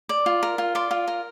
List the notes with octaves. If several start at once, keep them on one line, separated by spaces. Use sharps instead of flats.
D5
F4
A#4
F4
D5 C6
F4
A#4